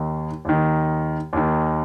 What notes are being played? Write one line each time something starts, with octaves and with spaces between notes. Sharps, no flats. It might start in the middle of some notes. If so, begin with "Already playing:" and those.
Already playing: D#2 D#3
D#2 D#3
D#2 D#3